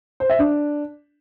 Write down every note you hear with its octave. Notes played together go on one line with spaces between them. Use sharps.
C5
E5
D4